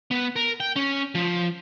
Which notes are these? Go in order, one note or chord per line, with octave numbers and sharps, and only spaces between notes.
B3
A#4
G5
C#4
F3